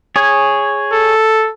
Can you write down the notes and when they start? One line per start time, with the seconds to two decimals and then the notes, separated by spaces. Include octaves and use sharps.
0.16 G#4 C#5
0.93 A4